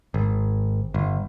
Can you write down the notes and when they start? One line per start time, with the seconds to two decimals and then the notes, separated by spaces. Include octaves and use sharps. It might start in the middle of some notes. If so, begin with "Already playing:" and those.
0.14 G#1
0.94 G1